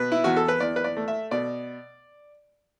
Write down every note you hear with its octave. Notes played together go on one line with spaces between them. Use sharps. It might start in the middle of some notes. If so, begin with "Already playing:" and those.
Already playing: B2 B4
E4
E2 F#4
A4
B4
E2 D5
B4
D5
A3
E5
B2 D5